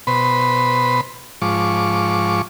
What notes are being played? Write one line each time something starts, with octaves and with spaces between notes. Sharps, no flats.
B2 B4 C5 B5
G#2 F3 C#6 D6